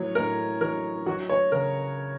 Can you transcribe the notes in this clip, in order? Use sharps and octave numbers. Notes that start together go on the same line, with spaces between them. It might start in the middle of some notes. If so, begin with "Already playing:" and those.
Already playing: A2 F#3 C#5
A2 A#4
F#3 A#4
F#3 F#4
C#5
C#3 A#4